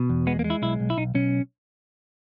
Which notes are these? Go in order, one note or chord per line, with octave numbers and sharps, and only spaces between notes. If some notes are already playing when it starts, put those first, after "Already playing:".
Already playing: B2
E2
G#3 B3
A#3
G#3
E4
B1 E4
B1
E4
B1 D#4
B1 C#4